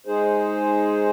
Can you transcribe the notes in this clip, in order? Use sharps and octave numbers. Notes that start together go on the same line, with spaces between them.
G#3 D#4 G#4 C5